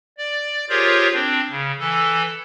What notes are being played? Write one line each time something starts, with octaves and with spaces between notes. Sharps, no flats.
D5
F4 G4 G#4 A#4 C5 C#5
C4 D4
C#3
E3 A4